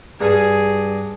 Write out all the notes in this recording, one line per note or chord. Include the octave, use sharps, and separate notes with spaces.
G2 G#4